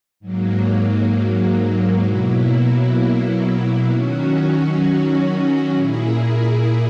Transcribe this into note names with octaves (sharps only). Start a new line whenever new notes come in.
G#2 F#3 A#3
B2 F#3 A#3 E4
D#3 F#3 C#4 F#4
A#2 A#3 E4 G#4